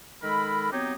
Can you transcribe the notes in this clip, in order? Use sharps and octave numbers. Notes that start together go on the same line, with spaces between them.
D#3 G#3 A4 A#4 B5
F#3 B3 C4 D#4 G4 C#5